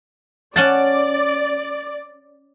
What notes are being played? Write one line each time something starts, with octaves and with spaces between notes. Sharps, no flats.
C#4 D5 F#5 A5